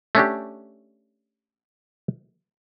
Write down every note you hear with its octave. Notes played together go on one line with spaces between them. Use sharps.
A3 C#4 D4 G4